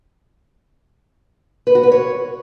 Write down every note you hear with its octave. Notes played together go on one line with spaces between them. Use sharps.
B4
F#4
B4
C#5